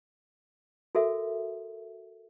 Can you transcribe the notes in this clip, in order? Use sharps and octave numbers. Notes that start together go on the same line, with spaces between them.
F#4 A4 A#4 E5